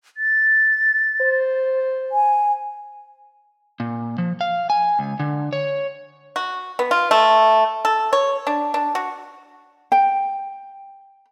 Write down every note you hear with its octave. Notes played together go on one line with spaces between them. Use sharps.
A6
C5
G#5
A#2
F3
F5
G#5
C#2
D3
C#5
F#4
B3
F4
A3
A4
C#5
D4
D4
F#4
G5